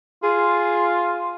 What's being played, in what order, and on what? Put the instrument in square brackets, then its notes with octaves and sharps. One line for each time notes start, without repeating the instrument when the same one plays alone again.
[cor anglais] F4 [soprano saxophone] G#4